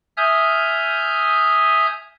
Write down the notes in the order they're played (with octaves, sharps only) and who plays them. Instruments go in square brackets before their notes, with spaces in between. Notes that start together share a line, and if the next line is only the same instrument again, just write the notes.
[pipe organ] E5 G#5 D#6 F6 G6